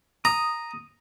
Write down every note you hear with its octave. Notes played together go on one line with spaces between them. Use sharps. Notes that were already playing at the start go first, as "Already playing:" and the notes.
A#5 D#6